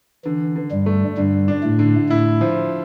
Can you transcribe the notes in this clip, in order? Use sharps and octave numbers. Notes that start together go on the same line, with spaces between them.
D3 E3
D3
G2 G3
A3
G2 D3 G3
D4
A2 A3
D3
A2 A3 E4
F3